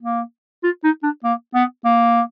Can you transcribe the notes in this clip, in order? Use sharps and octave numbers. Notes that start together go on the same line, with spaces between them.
A#3
F4
D#4
D4
A#3
B3
A#3